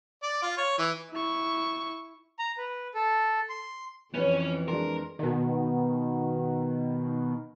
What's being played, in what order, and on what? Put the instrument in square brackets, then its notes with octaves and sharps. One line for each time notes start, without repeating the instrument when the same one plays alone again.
[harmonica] D5
F4
C#5
E3
[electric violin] E4 C#6
[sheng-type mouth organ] A#5
B4
A4
C6
[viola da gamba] F2 E3 [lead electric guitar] C#4 [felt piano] B4 C#5
[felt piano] G#3 D4 C6 [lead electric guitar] A#4
[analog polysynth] B2 D#3